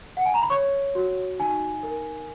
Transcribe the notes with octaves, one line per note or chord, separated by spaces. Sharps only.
F#5
G#5
A#5
B5
C#5 C#6
F#4
D#4 G#5
A#4